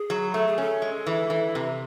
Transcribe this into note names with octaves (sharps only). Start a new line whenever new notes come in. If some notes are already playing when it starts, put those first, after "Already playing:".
Already playing: G#4
F#3
A3 A4
G#4
C#4 A4
G#3
E3
E3
C3